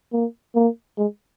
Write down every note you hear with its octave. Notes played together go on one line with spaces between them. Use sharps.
A#3
A#3
G#3